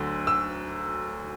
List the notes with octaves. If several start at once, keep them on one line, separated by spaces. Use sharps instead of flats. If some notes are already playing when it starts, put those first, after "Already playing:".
Already playing: D2 D3 F#3 E6
E6